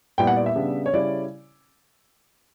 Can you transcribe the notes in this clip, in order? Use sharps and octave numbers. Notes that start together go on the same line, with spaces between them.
A#2 G3 B3 E4 G5
F#5
D5
E5
C#3 G3 B3 D4
C#5
C#3 G3 C#4 E4 D5